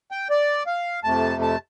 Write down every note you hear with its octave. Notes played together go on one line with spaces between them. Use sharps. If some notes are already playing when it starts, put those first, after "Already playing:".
G5
D5
F5
F2 C3 A3 A5
A5